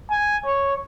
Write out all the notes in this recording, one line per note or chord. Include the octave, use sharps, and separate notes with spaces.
G#5
C#5